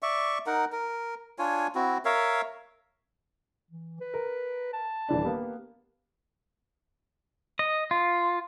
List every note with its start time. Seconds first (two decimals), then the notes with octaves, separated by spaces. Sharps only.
0.02 D5 E5 C#6
0.46 D#4 A#4 F#5
0.72 A#4
1.39 D4 F4 C#5 G#5
1.75 C4 E4 F#4
2.05 A#4 C#5 E5 F5
3.71 E3
4.01 B4
4.14 A#4
4.73 A5
5.09 D#1 E3 D4
5.24 A#3 B3 G4
7.59 D#5
7.91 F4